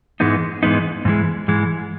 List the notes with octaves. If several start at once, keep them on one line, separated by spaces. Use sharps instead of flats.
G#2 E3 G#3 B3 D#4
G#2 E3 G#3 B3 D#4
G#2 E3 G#3
G#2 E3 G#3